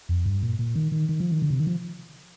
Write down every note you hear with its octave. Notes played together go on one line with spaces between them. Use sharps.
F2
G2
A#2
A#2
D#3
D#3
D#3
F3
D#3
D3
C3
D#3
F3